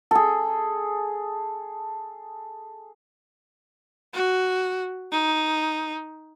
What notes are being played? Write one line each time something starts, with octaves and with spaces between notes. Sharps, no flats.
G#4 A4
F#4
D#4